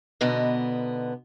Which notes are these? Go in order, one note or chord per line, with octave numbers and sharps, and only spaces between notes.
G#2 B2 D3 B3 D#5